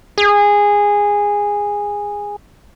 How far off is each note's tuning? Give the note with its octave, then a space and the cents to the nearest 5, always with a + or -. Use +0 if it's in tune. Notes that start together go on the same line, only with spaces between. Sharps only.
G#4 -15